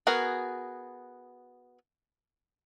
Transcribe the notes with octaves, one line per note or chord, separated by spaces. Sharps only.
B3 F#4 G#4 A#4